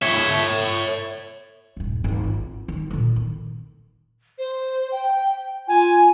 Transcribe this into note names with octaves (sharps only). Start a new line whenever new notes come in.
C#5 E5
D#1 G2
G#1 D2
F4
D#3
A#2 D3
D#3
C5
G5
F4 G#5